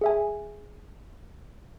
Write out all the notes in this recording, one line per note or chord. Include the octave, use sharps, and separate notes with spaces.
G#4 E5 G#5